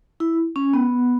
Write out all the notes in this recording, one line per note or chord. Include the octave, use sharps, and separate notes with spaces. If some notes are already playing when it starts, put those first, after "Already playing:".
E4
C#4
B3